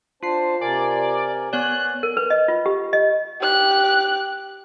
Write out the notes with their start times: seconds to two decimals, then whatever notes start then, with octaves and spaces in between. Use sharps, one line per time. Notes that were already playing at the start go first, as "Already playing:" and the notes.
0.23 D4 F4 C5 A5 C7
0.61 C3 A#4 D5 G#5
1.53 B3 C#5 D5 G#5 F#6
2.03 A#4
2.17 B4
2.30 D#5
2.48 F4
2.66 G4
2.93 D#5
3.41 G4 F#6